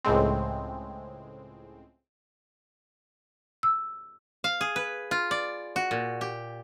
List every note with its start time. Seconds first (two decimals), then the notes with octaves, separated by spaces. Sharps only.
0.05 C#2 A2 G#3 C4
3.63 E6
4.44 F5
4.61 G#4
4.76 B4
5.11 F4
5.31 D5
5.76 F#4
5.91 A#2
6.21 G4